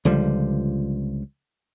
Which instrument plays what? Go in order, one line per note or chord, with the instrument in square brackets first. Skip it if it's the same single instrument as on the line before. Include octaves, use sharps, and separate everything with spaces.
[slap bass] C#2 D3 F3 G3